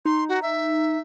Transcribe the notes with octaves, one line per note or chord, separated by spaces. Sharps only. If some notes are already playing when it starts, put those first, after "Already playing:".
D#4 C6
F#4
E5